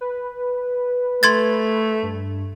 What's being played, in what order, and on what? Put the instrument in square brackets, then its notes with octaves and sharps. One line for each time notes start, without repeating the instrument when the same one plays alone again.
[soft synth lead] B4
[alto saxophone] A3 [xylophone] C6 G#6 A6
[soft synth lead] G2